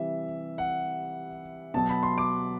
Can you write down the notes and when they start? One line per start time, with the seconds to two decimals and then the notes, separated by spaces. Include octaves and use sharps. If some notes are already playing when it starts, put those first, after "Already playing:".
Already playing: C3 E3 G3 E5
0.58 F#5
1.74 B2 F#3 A5
1.89 B5
2.03 C6
2.18 D6